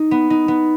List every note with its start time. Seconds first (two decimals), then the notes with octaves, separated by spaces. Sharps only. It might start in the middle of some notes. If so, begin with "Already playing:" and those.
Already playing: D#4
0.11 B3
0.30 D#4
0.48 B3